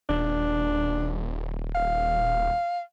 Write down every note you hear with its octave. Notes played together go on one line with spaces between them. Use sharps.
D#1 D4
F5